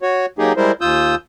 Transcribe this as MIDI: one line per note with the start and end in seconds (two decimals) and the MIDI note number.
0.02 0.26 66
0.02 0.26 73
0.39 0.53 54
0.39 0.53 58
0.39 0.53 63
0.39 0.53 67
0.39 0.53 68
0.57 0.72 55
0.57 0.72 56
0.57 0.72 64
0.57 0.72 70
0.57 0.72 72
0.81 1.15 39
0.81 1.15 65
0.81 1.15 87
0.81 1.15 88
0.81 1.15 91